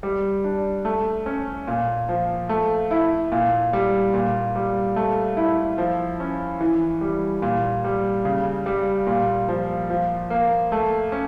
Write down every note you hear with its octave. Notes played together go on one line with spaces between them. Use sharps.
G3
D4
A3
C#4
A#2
F3
A3
E4
A#2
G3
A#2
G3
A3
E4
F3
C#4
E3
G3
A#2
G3
C#3
G3
A#2
F3
F3
A#3
A3
C#4